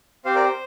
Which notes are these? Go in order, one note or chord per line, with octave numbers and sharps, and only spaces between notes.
C4 G4 C5 F5
A#4 D5
C5